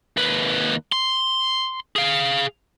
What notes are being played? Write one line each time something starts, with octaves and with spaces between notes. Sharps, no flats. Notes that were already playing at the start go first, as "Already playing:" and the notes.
D#2 B4
C6
G#4 F5